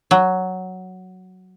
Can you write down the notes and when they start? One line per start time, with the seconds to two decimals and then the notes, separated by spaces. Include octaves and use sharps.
0.11 F#3